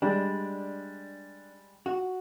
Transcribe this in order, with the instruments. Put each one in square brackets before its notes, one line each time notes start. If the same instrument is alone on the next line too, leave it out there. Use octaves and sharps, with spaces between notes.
[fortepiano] G3 G#3 [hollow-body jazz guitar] D4
[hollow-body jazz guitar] F#4